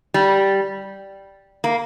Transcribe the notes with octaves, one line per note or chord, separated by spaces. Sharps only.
G3
A#3